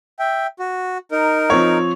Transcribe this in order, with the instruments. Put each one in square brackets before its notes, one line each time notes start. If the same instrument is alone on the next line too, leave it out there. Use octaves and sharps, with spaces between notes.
[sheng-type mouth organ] E5 G5
F#4
D#4 A#4
[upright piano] F3 C4 C#5